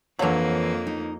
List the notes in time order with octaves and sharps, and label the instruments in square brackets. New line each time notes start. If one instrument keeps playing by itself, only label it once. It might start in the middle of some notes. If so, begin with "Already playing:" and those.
[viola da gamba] F2 A#3 [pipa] D3 F#3 [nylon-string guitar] E3 C#5 F5
[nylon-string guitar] D#4